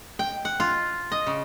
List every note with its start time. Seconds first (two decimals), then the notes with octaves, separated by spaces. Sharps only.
0.19 G5
0.45 F#5
0.60 F4
1.12 D#5
1.27 C#3